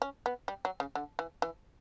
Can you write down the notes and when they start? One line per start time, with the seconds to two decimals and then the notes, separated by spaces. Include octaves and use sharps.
0.02 C#4
0.26 B3
0.48 G3
0.65 F#3
0.80 C#3
0.95 D3
1.19 E3
1.42 E3